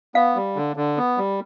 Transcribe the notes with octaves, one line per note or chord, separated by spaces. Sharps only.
B3 F5
G3
D3
D3
B3
G3